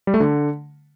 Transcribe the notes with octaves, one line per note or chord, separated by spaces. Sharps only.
G3
A3
D3